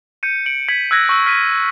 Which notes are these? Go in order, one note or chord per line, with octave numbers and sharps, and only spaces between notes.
G6 C#7 D#7
C#7 D7 F#7
G#6 B6 F#7
E6 F#6 G#6 A#6 B6
C#6 E6
F6 B6 D#7